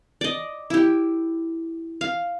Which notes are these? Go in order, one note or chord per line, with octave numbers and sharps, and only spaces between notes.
D5 D#5
E4 G4
F5